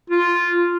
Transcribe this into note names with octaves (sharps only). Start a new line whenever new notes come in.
F4